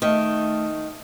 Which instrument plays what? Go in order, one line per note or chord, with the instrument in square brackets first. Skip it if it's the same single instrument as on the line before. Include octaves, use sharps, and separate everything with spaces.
[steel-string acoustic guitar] D#3 [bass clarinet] A3